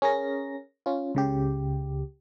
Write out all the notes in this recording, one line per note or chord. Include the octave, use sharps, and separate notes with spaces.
C#4 G#4 A#4 A#6
C#4 F4
C#2 C#3 G4